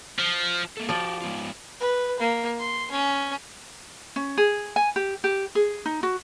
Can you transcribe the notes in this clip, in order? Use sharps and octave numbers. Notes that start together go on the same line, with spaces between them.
F3
A#3 A4
F3 F#4 G4 D5
G#3 B3 F4
B4
A#3
C6
C#4
C#4
G#4
G#5
G4
G4
G#4
D#4
F#4